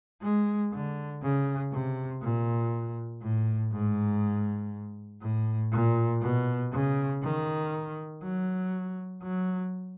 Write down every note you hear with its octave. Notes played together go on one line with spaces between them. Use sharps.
G#3
D3
C#3
C3
A#2
A2
G#2
A2
A#2
B2
C#3
D#3
F#3
F#3